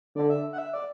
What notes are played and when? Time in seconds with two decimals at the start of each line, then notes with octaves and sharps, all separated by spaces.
0.15 D3 D5
0.30 E5
0.53 F#5
0.58 E5
0.73 D5